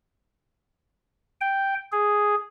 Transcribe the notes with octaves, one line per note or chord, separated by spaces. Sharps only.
G5
G#4